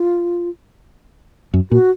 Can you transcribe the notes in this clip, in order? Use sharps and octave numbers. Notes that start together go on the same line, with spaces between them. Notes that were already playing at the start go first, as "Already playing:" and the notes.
Already playing: F4
F#2
A#2 F#4